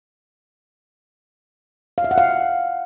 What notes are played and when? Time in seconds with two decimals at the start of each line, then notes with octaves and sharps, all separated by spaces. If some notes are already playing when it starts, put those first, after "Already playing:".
1.98 F5
2.04 E5
2.11 F#5
2.18 F5